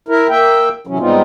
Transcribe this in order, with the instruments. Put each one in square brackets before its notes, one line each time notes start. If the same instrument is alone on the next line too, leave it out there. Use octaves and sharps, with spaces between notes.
[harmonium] E4 A#4
A#3 E5 G5
C3 E3 F#3 C#4
G#2 G3 B3 C4 D#4 F4